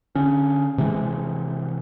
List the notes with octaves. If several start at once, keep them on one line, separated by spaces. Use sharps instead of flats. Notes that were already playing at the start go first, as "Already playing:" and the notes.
D3 C#4
C3 E3 G#3